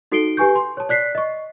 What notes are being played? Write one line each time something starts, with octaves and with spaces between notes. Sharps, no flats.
D#4 F#4 A4 C7 D7 G7
G4 B4 G#5 C#6 G6
C6
C#5 A5
D5 F#6 B6 C7
D#5 C#6